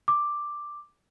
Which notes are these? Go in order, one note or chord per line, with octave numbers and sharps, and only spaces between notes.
D6